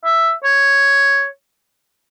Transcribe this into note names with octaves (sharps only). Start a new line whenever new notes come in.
E5
C#5